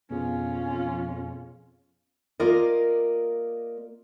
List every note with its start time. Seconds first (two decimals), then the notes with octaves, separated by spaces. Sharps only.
0.10 F2 B2 B3 C#4 F4 G#4
2.40 A#3 F4 A#4 D5 D#5